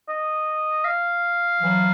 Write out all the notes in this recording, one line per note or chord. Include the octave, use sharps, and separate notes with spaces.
D#5
F5
E3 F#3